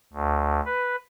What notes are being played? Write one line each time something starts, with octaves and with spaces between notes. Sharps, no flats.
D2
B4